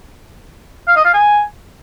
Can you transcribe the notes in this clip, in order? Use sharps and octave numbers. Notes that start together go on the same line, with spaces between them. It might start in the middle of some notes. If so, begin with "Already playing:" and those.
F5
D#5
F5
G#5